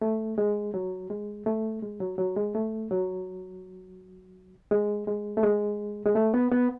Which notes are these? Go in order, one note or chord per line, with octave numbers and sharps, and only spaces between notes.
A3
G#3
F#3
G#3
A3
G#3
F#3
F#3
G#3
A3
F#3
G#3
G#3
A3
G#3
G#3
A3
B3
B3